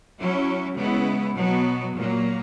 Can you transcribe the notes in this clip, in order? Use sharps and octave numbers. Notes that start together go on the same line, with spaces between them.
F#3 C#4 E4
C#3 G#3 B3 E4
B2 F#3 B3
A#2 F#3 A#3